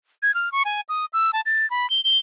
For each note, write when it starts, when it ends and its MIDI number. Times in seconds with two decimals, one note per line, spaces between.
0.23 0.34 92
0.34 0.52 89
0.52 0.63 85
0.65 0.81 80
0.89 1.05 87
1.13 1.31 88
1.33 1.41 81
1.46 1.68 93
1.70 1.89 83
1.90 2.03 103
2.04 2.18 103